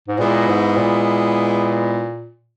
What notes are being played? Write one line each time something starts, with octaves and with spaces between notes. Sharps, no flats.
G#2
A#2 G#3 B3 E4
G#2
A#2